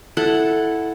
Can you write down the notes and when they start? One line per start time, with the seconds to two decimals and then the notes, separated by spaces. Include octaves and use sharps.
0.17 E4 A4 F#5